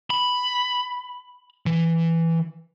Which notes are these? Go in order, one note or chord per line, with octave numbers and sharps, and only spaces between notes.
B5
E3